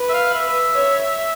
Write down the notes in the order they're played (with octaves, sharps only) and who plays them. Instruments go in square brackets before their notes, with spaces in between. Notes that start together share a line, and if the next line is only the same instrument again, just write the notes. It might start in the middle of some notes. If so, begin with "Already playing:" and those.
Already playing: [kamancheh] B4
[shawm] E5
F5
E5
[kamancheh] C#5